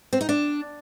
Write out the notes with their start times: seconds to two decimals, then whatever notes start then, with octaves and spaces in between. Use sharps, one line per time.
0.13 C4
0.21 D#4
0.29 D4